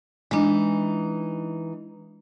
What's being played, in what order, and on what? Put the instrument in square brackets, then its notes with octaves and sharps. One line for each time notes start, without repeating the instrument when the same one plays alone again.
[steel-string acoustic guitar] E3 D#4 [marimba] G#3 D4